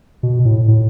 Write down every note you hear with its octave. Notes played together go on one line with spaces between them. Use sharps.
B2
A2
A2